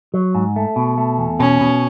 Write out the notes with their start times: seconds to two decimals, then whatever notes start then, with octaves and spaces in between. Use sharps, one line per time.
0.14 F#3
0.35 G#2
0.56 A3
0.76 B2
0.98 A3
1.18 E2
1.39 B2 C#4
1.61 B2